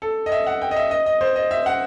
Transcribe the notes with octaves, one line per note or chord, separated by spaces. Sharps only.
A4
D#5
E5
F#5
G5
D#5
E5
D#5
D#5
C5
D#5
E5
F#5